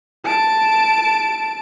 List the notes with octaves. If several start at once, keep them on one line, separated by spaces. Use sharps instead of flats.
A5 D7